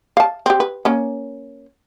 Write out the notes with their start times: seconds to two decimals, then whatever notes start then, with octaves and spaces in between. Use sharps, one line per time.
0.17 F5 A5
0.46 C4 G4
0.60 B4
0.85 A#3 C#4